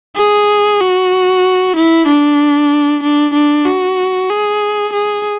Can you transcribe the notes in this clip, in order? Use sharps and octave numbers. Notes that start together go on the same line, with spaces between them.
G#4
F#4
E4
D4
D4
D4
F#4
G#4
G#4